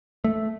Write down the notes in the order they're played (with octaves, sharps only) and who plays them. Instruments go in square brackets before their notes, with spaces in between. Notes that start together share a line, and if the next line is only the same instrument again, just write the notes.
[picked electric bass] A3